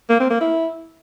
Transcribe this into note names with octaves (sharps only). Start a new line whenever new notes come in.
A#3
C4
A#3
E4